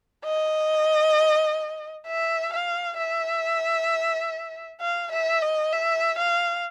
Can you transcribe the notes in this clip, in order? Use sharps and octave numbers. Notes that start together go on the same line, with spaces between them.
D#5
E5
F5
E5
F5
E5
D#5
E5
F5